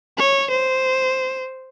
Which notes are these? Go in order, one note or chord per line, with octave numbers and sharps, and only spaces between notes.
C#5
C5